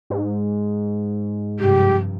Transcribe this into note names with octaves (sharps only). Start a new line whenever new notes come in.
G#2
G2 C3 F3 G4